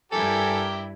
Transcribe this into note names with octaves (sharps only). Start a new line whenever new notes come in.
G2 E4 G4 A4 A#4 G5 G#5